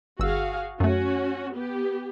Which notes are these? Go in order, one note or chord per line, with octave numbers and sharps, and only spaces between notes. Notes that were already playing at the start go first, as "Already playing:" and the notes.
G1 F#4 G#4 F5 E6
F#2 A3 C#4 F#4
B3 G4